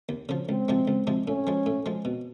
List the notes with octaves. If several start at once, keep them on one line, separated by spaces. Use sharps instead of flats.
D#2
C#3 F3
C#2 C4
C3 F3 G#3
C#2
C3 F3 G#3
A2 C#4
F3 G#3
A2
F3 G#3
B2